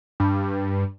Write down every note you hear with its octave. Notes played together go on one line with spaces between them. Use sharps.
G2